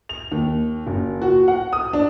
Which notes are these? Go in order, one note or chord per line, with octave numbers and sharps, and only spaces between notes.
F7
D#2
F#1
F#4
F#5
D#6
D4